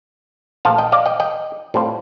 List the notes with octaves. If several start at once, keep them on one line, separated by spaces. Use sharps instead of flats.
A#1 A#2 F3 A3 F5 A5
D#5 G5
D5 F5
D#5 G5
D#5 G5
A2 G3 C4 F4